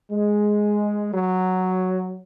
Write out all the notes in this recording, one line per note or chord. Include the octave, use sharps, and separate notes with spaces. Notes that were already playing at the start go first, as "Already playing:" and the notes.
G#3
F#3